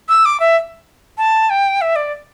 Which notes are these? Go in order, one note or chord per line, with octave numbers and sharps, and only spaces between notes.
E6
D6
E5
A5
G5
E5
D5